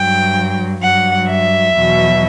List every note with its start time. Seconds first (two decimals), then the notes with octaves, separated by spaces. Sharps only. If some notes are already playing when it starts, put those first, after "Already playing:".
Already playing: G2 F#3 G5
0.82 G2 F#3 F#5
1.28 E5
1.75 E2 B2 F#3